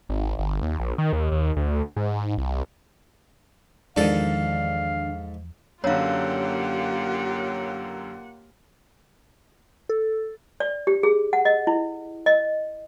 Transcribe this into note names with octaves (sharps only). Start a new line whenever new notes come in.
G#1
G1
D#2
A#1
D#3
D#2
D#2
D2
G#2
C2
E2 G#2 D#3 F3 D4 A4 F5
F#2 D3 A#3 F4 G4 C#5 F5 F#5
A4
D5
G4
G#4
F#5
D#5
E4
D#5